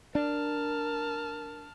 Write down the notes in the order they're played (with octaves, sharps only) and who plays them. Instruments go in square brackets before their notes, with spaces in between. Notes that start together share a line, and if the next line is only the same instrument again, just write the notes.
[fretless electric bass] D4 [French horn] A#4 [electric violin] A5 F6